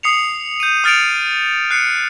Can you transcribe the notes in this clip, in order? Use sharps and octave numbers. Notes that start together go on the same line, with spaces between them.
D#6 C7 C#7 F7
G6 D#7
D#6 F6 A6 C#7 D7 F7
F#6 C7 C#7